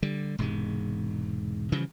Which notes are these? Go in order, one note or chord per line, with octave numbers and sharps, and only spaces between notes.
D3 G3
E1 G#2 C3 G#3
C#3 E3 F3 G3